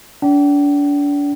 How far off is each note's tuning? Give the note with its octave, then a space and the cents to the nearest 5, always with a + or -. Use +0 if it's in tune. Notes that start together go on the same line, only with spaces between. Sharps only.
D4 -35 G5 -40